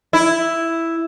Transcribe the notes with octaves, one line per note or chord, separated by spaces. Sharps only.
E4